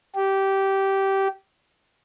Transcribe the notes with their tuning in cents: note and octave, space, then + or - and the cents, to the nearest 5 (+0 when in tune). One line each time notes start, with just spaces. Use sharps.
G4 -15